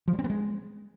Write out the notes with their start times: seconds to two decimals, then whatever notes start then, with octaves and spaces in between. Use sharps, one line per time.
0.08 F3
0.13 G3
0.19 C4
0.24 B3
0.30 G#3